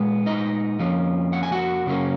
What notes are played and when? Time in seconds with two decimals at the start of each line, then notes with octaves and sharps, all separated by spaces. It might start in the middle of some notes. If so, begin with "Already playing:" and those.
Already playing: A#2 G#3 B3
0.26 D#4 D#5
0.79 F2 F3 A#3 C#4
1.33 F#5
1.43 G#5
1.52 F#4 F#5
1.86 F#2 C#3 F#3 A#3 C#4